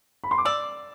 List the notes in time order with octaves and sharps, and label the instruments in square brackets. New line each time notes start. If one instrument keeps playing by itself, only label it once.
[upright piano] B5
C6
D6
[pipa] D5 [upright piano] E6